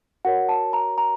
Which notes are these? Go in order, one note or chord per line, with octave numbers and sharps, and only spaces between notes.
F#4 A#4 C#5 F#5
A5
A#5
A#5